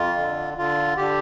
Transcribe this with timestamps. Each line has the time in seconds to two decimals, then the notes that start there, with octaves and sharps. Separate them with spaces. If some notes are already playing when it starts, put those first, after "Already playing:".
Already playing: F2 F4
0.18 D3
0.58 D3 F4
0.97 D3 G4